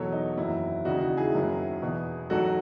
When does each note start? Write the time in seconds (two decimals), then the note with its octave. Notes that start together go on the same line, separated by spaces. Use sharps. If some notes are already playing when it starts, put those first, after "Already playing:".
Already playing: E2 B2 F#3 A4 C#5
0.12 D#4
0.37 F#1 E2 D#3 F#3 E4
0.85 E1 D#2 C#3 E3 D#4 F#4
1.01 D#4 F#4
1.17 E4 G#4
1.33 F#1 F#2 D#3 F#3
1.82 E1 E2 B2
2.30 A1 G#2 F#3 F#4 A4